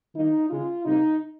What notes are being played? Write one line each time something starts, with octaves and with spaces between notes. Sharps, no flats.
D#3 G3 A#3 D#4
C#3 G#3 F4
C3 G3 A#3 D#4